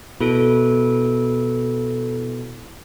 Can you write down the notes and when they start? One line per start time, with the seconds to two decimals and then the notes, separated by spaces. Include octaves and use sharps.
0.21 B2 E4 A4 D7